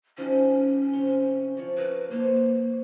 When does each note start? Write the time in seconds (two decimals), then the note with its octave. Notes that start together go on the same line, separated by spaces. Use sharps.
0.18 F3 C#4 D#4 G4
0.93 C3 C#5 C6
1.57 F3 C#5 D5
1.77 A#4 B4 D5
2.11 A#3 C5 C#5 A5